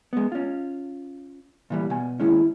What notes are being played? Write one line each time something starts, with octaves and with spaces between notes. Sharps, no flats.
G#3 B3
C#4 F4
A#2 E3 G3
B2 G#5
D#2 G#3 C#4 E4